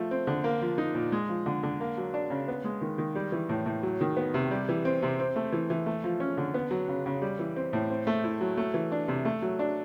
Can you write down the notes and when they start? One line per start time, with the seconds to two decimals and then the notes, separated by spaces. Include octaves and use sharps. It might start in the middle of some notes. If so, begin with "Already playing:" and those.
Already playing: F3 A3
0.11 C4
0.27 D3
0.44 A#3
0.62 F3
0.78 D#4
0.95 A#2
1.12 G#3
1.29 F3
1.46 D3
1.63 D3
1.80 A#3
1.98 F#3
2.14 D4
2.30 C#3
2.48 B3
2.64 G#3
2.81 D#3
2.98 D#3
3.15 G3
3.32 E3
3.49 A2
3.66 A2
3.83 F#3
4.01 D#3
4.17 B3
4.34 C3
4.51 G3
4.69 E3
4.85 C4
5.03 C3
5.19 C4
5.36 A3
5.52 E3
5.70 E3
5.86 A3
6.04 F3
6.20 C#4
6.38 D3
6.54 B3
6.71 F#3
6.88 C#3
7.06 C#3
7.22 G3
7.39 E3
7.56 C4
7.73 A2
7.90 C4
8.07 A3
8.24 E4
8.41 F#3
8.57 A3
8.74 E3
8.92 D4
9.08 C3
9.25 A3
9.42 F#3
9.59 D4